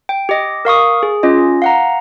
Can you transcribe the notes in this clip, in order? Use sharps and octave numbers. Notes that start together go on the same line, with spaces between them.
G5
G4 D#5
A#4 F5 C#6 D#6
G#4
C#4 F4 D#5
F5 F#5 A#5